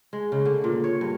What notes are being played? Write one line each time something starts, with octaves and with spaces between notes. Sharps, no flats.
G#3
C#3
D3
A#2
C#5
G2